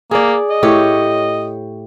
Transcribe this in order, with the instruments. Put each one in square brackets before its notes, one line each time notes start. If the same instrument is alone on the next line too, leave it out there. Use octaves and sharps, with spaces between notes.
[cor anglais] A#3 [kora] G#4 D5
[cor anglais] D#5
[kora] A2 G4 C#5